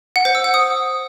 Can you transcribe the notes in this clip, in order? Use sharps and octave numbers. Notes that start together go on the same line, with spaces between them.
F#5
C5
E6
F#5
D#6